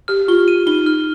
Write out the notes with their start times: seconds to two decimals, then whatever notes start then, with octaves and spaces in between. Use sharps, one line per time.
0.08 G4 F6
0.28 F4 G7
0.48 D#7
0.67 D#4 G7
0.86 F6